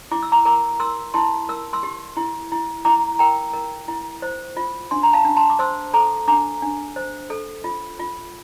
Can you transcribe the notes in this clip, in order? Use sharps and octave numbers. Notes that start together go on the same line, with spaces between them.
E4 D6
E6
A#5 D6
A#4 A#5 D6
A#4 C6 E6
E4 A5 C6
A#4 E6
C6 E6
G4
E4
E4
E4 A#5 D6
A#4 G5 A#5
A#4
E4
C5
F4
D4 C6
A#5
F5 A5
D4
A5 C6
D6
C5 C6 E6
A4 A#5 D6
D4 A#5 D6
D4
C5
A4
F4
F4